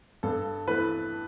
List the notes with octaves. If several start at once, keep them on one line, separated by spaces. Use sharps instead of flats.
G2 A4
E3 A3 B4